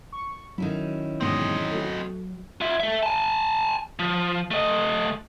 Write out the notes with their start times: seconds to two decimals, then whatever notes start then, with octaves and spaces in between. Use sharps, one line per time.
0.12 C#6
0.58 D#3 F#3 C#4 E4
1.21 E2 G#2 B2 C4 D#5
1.71 A3 F#4
2.61 F4 E5
2.80 A4 E5
3.03 G#5 A5
3.99 F3
4.51 A3 D#5